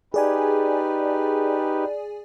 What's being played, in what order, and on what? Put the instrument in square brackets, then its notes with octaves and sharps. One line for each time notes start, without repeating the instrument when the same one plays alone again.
[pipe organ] D#4 G4 B4 [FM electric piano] G#4 D5 G#5